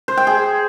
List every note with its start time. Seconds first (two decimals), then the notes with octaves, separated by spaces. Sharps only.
0.08 C5
0.17 G5
0.27 G#4